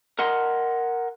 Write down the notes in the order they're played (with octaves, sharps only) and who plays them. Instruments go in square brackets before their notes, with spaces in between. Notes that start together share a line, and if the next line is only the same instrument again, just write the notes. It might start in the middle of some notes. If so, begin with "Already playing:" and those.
[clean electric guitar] A#4 D#5 F#5 C6